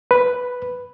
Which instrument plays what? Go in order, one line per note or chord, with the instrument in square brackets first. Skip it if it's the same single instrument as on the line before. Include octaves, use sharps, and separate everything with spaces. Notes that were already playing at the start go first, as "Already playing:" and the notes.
[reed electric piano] B4